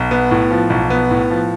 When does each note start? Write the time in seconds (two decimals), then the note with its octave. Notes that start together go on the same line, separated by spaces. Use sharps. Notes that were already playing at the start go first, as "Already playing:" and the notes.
Already playing: B1
0.11 B3
0.31 A2
0.50 F3
0.70 B1
0.90 B3
1.11 A2
1.31 F3